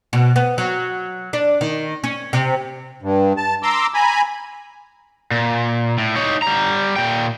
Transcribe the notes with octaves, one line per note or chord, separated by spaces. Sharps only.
B2
B3
F#3
D4
D#3
C#4
C3
G2
A5
A#5 C6 D6 E6
G#5 A#5 B5
A#2
A2
D#4 C#5
G3 A#5
A#2 G5